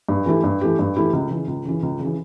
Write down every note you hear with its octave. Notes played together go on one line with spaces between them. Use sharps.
G2
E3 A3 E4 G4
G2
E3 A3 E4 G4
G2
E3 A3 E4 G4
C#2
C#3 E3
C#2
C#3 E3
C#2
C#3
E3